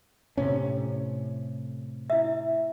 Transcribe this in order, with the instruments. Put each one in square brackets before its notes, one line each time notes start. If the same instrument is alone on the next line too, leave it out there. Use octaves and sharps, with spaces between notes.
[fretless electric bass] A2 C3 C#4
[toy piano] E4 E5